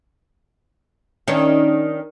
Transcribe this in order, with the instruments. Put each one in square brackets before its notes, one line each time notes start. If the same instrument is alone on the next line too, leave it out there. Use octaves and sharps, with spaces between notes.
[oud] D#3 C#4 D4